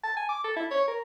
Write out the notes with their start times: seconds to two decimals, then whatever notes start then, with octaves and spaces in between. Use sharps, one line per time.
0.04 A5
0.16 G#5
0.29 D6
0.44 A4
0.56 E4
0.71 C#5
0.88 A#4